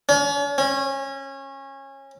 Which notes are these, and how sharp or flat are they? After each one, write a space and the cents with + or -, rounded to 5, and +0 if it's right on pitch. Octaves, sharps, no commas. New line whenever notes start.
C#4 +40
C#4 -25